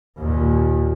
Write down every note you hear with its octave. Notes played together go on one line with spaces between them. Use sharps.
D#2 A#2